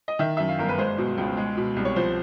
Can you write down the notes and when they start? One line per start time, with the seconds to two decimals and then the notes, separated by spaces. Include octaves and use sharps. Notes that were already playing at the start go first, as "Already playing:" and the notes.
0.08 D#5
0.19 D#3 E5
0.37 F#2 E5
0.49 F5
0.59 G1 A#4
0.69 B4
0.78 G#3 C5
0.98 B2
1.18 C#2
1.37 G#3
1.57 B2
1.76 C2
1.85 C#5
1.96 F3 C5